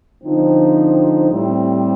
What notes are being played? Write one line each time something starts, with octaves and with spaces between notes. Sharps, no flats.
D3 F3 C4 D#4
A2 G3 C4